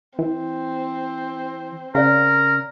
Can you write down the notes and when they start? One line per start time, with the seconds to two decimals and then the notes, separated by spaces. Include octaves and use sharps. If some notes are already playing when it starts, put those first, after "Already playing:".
0.19 E3 C4
1.95 C#3 A#4 C#5 D5 F5